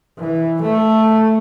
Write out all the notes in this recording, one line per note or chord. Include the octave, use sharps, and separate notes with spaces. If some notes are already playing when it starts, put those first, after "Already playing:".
E3
A3